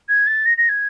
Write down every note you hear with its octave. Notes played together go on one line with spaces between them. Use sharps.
G#6
A6
A#6
A#6
G#6